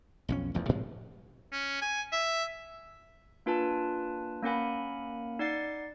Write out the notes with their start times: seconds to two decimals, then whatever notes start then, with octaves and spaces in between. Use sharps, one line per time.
0.29 B1 F2 C#4
0.54 E1 A1 E2 F3
0.69 A2 C3 F3 G#3
1.53 C#4
1.82 G#5
2.12 E5
3.46 A#3 D4 F4 B4 G#5 A5
4.43 A#3 C#4 A#4 F#5 G#5 B5
5.39 D#4 D5 F#5 A6 C7